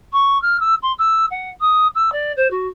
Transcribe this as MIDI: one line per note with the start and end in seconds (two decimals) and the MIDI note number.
0.13 0.40 85
0.42 0.57 89
0.60 0.75 88
0.82 0.92 84
0.99 1.26 88
1.31 1.50 78
1.60 1.87 87
1.95 2.10 88
2.12 2.32 74
2.37 2.48 72
2.51 2.68 66